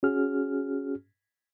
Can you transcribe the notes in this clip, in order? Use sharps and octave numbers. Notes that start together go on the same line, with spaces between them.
C#4 F#4 G#4 F6